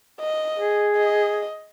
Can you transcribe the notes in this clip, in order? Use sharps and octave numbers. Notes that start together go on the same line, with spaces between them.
D#5
G#4
D#5